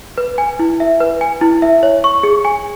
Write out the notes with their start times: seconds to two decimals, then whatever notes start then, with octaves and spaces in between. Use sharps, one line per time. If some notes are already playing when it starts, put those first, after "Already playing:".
0.18 B4
0.38 G#5
0.59 E4
0.80 E5
1.00 B4
1.21 G#5
1.41 E4
1.62 E5
1.83 C#5
2.04 C#6
2.23 G#4
2.45 G#5